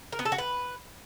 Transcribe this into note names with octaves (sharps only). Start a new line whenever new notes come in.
A#4
B3
A4
F#4
B4